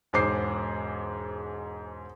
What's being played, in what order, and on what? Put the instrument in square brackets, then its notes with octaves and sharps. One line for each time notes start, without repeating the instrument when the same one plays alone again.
[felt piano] E1 G#2 G#3 C5 D6 C7